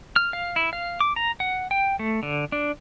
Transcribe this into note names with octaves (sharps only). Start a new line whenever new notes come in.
F6
F5
E4
F5
D6
A#5
F#5
G5
A3
D3
D4